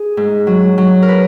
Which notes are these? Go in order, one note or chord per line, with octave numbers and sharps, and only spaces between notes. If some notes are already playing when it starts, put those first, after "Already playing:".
Already playing: G#4
G#2
F#3
F#3
A#4
B4